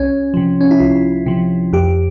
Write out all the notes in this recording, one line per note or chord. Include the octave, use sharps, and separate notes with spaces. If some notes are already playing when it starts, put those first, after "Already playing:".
Already playing: C2 C#4
C3 F3
C#4
E4
C2 F4
C3 F3
F2 G4